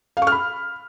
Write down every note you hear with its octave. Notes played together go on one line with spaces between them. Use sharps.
F5
C#6
F6
B5